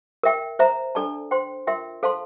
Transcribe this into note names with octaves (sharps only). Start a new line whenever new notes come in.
A#4 E5 G5
C5 E5 A#5
D4 A4 D5 A5
C5 G5 C6
F4 A#4 E5 G5 C6
A4 C5 F5 A5 C6